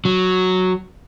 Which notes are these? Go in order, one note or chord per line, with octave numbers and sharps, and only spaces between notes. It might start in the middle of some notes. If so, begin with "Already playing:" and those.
F#3